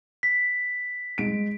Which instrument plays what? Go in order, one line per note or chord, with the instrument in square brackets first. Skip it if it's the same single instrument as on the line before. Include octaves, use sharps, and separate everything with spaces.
[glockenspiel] B6
[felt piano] G#3 D7